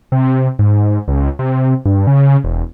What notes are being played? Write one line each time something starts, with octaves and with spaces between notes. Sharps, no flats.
C3
G#2
C#2
C3
G2
C#3
E1